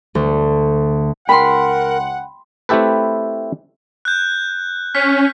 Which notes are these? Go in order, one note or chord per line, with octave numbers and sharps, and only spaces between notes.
D2
C#2 A#4 F#5 G5 B5 C6
A3 C4 E4 G4 A4 B4
F#6 G6
C#4 F6 B6